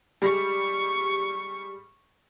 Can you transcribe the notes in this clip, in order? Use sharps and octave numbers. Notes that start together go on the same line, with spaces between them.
G3 G#3 C#6